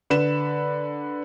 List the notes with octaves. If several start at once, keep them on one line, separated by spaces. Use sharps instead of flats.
D3 B4 B5 E7